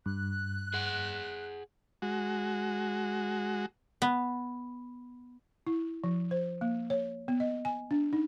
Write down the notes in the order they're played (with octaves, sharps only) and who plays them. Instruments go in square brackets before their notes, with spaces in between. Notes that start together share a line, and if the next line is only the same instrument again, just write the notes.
[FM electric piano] G2 [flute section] F#6
[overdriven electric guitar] G#4 F#5
[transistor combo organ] G#3 F#4
[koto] B3
[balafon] E4
F3
C5
A#3
C#5
B3
D#5
G#5
D4
D#4